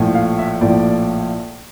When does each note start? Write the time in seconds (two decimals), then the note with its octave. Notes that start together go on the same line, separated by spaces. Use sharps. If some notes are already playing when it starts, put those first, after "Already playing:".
Already playing: A#1 A2 F3
0.15 F5
0.39 E5
0.61 A#1 A2 F3 D5